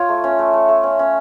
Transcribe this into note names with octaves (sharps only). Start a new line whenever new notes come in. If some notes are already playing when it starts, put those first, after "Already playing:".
Already playing: F4 C#5
A3
C#4
A3
A3
A3
C#4
C#4